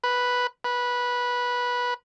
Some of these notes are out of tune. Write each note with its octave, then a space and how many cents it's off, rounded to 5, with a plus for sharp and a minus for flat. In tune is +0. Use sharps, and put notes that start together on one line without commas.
B4 -5
B4 -15